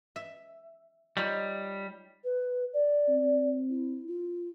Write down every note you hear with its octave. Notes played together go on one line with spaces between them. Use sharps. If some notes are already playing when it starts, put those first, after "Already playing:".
E5
G3 D#4 F4 C#5
B4
D5
C4
E4
F4